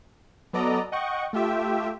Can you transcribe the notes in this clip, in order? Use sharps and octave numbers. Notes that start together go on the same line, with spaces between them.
F#3 B3 A4 D5 D#5 A#5
D#5 F#5 G5 C#6
A3 F4 G4 E5 G5